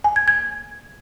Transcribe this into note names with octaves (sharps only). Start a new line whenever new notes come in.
G#5
G#6
G#6